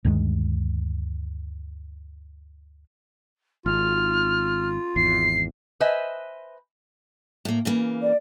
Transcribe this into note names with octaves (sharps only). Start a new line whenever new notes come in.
D2 G2 D#3 G#3
G#1 F4 F6
G#1 E2 C7
B4 C5 D#5 E5 G#5
A2 A#3
C#3 E3 A#3
D5